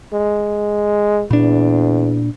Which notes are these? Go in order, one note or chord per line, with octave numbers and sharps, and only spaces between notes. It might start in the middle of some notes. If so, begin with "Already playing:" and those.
G#3
E2 A#2 D4